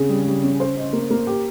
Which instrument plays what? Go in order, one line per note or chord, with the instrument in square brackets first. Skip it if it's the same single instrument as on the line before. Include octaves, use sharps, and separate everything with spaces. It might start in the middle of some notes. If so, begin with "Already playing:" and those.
Already playing: [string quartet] C#3 [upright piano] C4 G#4
[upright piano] G3
G3
C#4
C5
D#5
A#3
A#3
G4